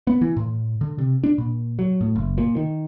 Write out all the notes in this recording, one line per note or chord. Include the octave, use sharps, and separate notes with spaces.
B3
E3
A2
D3
C3
D4
A#2
F#3
A2
F#1
A#2
D#3